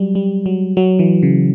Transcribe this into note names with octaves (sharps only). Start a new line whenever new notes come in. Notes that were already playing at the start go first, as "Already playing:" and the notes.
Already playing: F#3 G3
G3
F#3
F#3
E3
C#3